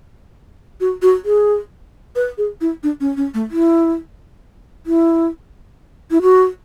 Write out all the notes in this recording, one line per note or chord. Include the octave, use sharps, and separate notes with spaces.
F#4
F#4
G#4
B4
G#4
E4
D4
C#4
C#4
A3
E4
E4
E4
F#4